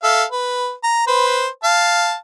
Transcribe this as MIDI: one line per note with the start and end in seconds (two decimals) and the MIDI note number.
0.03 0.24 69
0.03 0.24 76
0.03 0.24 77
0.31 0.73 71
0.84 1.07 82
1.07 1.47 71
1.07 1.47 72
1.64 2.15 77
1.64 2.15 81